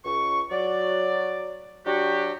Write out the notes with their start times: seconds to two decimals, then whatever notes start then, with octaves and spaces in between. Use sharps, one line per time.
0.05 C#2 C#6
0.51 F#3 D5
1.86 F#3 D4 F#4 G4